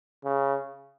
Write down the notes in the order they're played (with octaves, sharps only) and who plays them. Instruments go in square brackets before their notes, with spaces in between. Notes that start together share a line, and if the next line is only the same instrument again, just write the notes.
[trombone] C#3